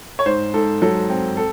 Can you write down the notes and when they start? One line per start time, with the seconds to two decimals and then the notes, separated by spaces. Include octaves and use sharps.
0.19 C#5
0.26 G#2 C5
0.54 G#2 A4
0.82 F#3 A4
1.09 C4
1.37 A4